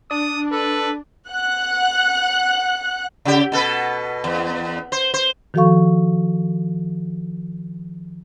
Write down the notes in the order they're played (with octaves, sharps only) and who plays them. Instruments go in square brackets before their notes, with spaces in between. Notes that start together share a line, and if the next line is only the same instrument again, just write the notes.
[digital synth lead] D4 [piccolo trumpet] D#6
[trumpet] A4 [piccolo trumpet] B4
[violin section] F#5 F#6
[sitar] C#3 G4
B2 A4 B4
E2
C5
C5
[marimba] D#3 F3 F#4 A4 F5 C#6